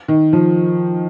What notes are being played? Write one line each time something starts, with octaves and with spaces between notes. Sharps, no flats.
D#3
F3